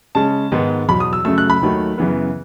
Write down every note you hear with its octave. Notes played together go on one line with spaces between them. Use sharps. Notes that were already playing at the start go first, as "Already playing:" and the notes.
C#3 G#3 C#4 A5
G#2 D#3 G#3 B3
E2 B2 F#3 B5
D#6
E6
F#2 C#3 F#3 A3 E6
F#6
B5
D#2 D#3 F#3 A3
F#2 C#3 E3 B3